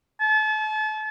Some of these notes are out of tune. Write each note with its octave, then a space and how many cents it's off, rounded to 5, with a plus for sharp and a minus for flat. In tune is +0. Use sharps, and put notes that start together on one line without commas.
A5 -35